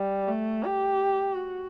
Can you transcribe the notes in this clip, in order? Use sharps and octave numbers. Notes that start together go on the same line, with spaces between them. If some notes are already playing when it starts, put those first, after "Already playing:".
Already playing: G3
A3
G4
F#4